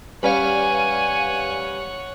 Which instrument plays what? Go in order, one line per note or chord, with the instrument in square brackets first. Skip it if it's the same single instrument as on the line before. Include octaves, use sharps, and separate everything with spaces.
[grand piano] G3 C#4 [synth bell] B4 D5 F5 [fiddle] C#5 F#5 [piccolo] G#5